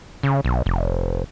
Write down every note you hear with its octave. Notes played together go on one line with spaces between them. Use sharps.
C#3
B1
F1